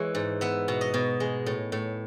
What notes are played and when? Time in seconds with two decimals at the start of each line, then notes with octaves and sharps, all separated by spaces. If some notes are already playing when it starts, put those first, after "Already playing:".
Already playing: E3 G#3 C#5
0.15 G#2
0.41 B3 E5
0.68 B2
0.81 D#5
0.94 B2
1.20 G#3
1.46 A2
1.72 A2